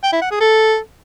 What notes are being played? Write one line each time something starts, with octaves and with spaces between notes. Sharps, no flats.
G5
E4
F#5
G#4
A4